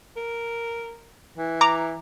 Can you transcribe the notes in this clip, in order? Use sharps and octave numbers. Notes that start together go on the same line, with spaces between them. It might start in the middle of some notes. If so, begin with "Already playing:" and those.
A#4
E3
A#5 D6